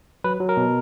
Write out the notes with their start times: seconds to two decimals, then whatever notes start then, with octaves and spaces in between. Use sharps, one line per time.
0.24 F#3 B4
0.40 F#3
0.49 A#4
0.57 B2